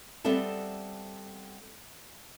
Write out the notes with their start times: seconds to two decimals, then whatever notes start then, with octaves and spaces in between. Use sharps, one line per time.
0.24 G3 B3 C4 A4 E5 A5